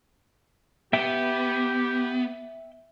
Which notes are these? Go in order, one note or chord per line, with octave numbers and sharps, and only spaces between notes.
B3 G4 E5 G5